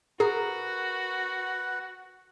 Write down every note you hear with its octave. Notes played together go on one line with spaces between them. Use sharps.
F#4 G#4 A#4 B4 F#5